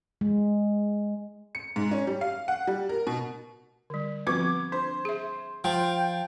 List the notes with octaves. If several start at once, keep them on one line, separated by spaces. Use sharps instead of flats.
G#3
C#7
G#2
C#4
G3
F5
F#5
G3
A#4
B2
D3 G3
F3 B3 C4 F#4 D6 G#6
D4 C5
G#4 E5
F3 G5